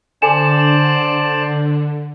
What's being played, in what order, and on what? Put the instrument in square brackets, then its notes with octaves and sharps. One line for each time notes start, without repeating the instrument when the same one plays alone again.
[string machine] D3 [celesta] A4 G#5 E7 [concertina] C5 D5 A5